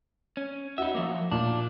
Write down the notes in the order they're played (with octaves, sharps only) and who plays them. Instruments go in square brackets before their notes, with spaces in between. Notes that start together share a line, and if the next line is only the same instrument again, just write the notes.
[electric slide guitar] C#4
[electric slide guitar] D#4 E5 [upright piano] F#4
[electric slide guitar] F3 F#3 A#3
[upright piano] A#2 [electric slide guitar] D4